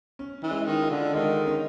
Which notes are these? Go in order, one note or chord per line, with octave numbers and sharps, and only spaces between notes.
C#4
E3
G#3
D#3
F4
D3
D#3 G#3
C#4